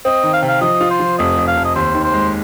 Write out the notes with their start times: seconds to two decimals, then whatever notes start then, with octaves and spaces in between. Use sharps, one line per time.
0.05 C4 D#5
0.23 D#3
0.33 F5
0.42 C3
0.48 F5
0.61 F3 D#5
0.81 F4
0.90 C5
1.00 F3
1.18 F1 D#5
1.38 F1
1.47 F5
1.57 F1
1.65 D#5
1.75 D#2 C5
1.94 D#3
2.04 C5
2.14 G#3